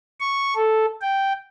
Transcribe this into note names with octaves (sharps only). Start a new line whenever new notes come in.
C#6
A4
G5